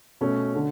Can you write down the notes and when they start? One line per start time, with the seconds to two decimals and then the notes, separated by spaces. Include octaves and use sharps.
0.21 B2 A3 C#4
0.56 D3